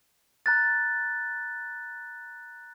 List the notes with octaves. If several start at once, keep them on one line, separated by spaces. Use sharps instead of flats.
A#5 F#6 A6